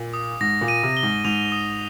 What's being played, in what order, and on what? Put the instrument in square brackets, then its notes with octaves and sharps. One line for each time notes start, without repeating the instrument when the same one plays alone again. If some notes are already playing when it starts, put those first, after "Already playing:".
Already playing: [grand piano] A#2
[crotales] D#6
[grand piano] G#2 [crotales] A#6
[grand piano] A#2
[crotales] D#7
[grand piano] C3
[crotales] G7
[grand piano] G#2
[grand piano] G#2 [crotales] F7
[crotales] D#6